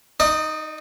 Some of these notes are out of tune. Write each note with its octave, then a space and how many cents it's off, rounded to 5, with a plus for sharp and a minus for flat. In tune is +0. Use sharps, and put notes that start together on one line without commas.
D#4 +0 D5 +45